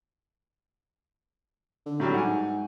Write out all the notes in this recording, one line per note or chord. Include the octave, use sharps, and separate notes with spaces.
D3
A2 F#3 G3
G#2 F#5 G#5